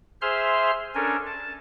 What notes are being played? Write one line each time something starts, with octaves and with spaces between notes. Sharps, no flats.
G#4 C5 E5 C6 F6
C#4 D4 A4 A#4 G#5
A5